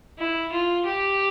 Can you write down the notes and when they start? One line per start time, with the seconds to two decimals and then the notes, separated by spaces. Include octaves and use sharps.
0.18 E4
0.52 F4
0.86 G4